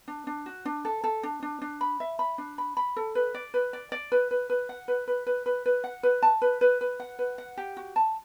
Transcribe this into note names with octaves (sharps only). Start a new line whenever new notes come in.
D4
D4
F#4
D4
A4
A4
D4
D4
D4
B5
E5
B5
D4
B5
B5
A4
B4
D5
B4
D5
D5
B4
B4
B4
F#5
B4
B4
B4
B4
B4
F#5
B4
A5
B4
B4
B4
F#5
B4
F#5
G4
F#4
A5